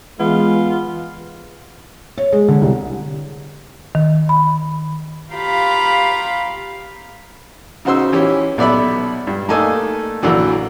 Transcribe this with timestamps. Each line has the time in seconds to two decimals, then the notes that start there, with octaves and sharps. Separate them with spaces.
0.20 E3 G#3 B3 F4
2.18 C#5
2.32 G#3
2.49 D3
2.62 C2
3.95 D#3
4.29 B5
5.32 F4 G4 F5 A#5 B5
7.85 C#3 D#4 F#4 C5 C6 E6
8.13 E3 C#4 G4
8.58 B1 B3 D5 E5 B5
9.27 G2
9.49 A3 A#3 D#4 A4 D5 G#5
10.22 A#1 D3 E3 F#3